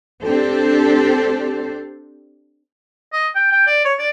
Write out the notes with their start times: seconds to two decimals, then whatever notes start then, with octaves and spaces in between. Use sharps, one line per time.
0.22 C4 D4 G4 A4 C5
3.13 D#5
3.35 G5
3.52 G5
3.67 D5
3.85 C#5
3.99 D5